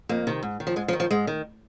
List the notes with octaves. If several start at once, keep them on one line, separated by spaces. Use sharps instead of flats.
F2 A#3
C3 D#3
G#2
D#3
F3
G#2 G#3
F3
D#3
F3
G#2 G#3
D#3